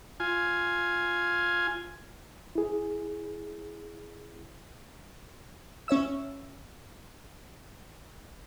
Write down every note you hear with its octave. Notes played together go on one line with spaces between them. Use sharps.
F4 G#5
E4 G#4
C#4 C#5 E5 E6